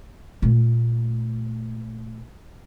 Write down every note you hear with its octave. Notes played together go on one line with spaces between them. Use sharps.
A#2 A3